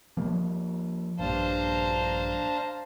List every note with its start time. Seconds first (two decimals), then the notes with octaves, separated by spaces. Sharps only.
0.17 F3 G3 A#3
1.19 A#1 G2 D4 C5 F5 A5 A#5